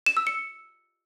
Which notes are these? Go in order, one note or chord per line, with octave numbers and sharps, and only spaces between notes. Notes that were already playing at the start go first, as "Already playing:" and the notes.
E7
E6
C#7